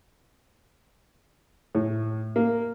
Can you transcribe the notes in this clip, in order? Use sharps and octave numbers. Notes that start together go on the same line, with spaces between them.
A2
A#3